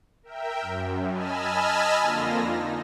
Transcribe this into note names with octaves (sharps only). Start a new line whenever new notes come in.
A#4 E5 G5
F#2
D#5 G#5 A5 B5 E6 F6
F2 D3 A#3 F4 A#6
D#4